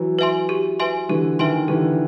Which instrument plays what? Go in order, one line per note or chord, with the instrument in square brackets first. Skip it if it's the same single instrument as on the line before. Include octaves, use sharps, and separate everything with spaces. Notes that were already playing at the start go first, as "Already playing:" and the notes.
Already playing: [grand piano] E3 F#3
[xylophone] B4 E5 G#5 C6
G4
B4 E5 G#5 C6
[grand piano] D3 E3 [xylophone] G4
[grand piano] D#3 [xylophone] B4 E5 G#5 C6
[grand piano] D3 E3 [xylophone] G4